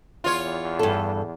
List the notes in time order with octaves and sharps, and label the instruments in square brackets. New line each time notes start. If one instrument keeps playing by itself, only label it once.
[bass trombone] E2 [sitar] F4 C#5
[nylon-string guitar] G2 A4